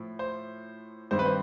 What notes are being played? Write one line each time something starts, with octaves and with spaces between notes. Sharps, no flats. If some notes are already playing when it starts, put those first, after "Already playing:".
Already playing: A2 F3
C5
G2 D#3 G3 C4 C5
B4
C5